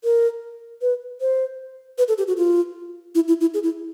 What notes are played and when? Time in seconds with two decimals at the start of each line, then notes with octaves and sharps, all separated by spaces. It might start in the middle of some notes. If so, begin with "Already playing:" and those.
0.04 A#4
0.82 B4
1.21 C5
1.98 B4
2.08 A4
2.18 G4
2.28 F#4
2.37 F4
3.15 E4
3.28 E4
3.41 E4
3.54 G#4
3.63 E4